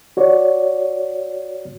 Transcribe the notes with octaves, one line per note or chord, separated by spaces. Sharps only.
F#4 C#5 D5